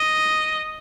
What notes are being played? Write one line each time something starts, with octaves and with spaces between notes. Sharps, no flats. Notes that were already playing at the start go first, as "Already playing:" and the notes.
Already playing: D#5